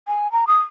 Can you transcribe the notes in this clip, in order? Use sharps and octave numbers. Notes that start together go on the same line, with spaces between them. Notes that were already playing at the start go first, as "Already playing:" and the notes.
G#5
A#5
D#6